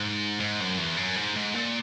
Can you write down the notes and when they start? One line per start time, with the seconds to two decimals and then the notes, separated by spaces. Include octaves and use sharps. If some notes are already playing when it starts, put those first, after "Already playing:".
Already playing: G#2
0.40 G#2
0.60 F#2
0.78 E2
0.97 F#2
1.17 G#2
1.36 G#2
1.55 A#2